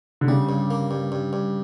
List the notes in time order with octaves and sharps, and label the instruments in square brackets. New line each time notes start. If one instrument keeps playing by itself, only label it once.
[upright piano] D3
[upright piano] C#3 [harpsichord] G3
[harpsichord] G2
A#3
G2
G2
G2